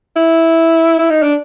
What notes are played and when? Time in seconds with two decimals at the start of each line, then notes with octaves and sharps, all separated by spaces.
0.16 E4
0.99 E4
1.10 D#4
1.22 D4